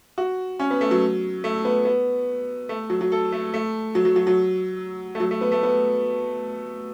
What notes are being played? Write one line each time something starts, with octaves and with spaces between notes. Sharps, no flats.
F#4
C#4
B3
A3
F#3
A3
B3
B3
A3
F#3
F#3
A4
A3
A3
F#3
F#3
F#3
F#3
A3
F#3
A3
B3
A3
B3